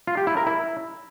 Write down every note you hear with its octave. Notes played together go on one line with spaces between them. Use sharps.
F4
G4
E4
A#4
E4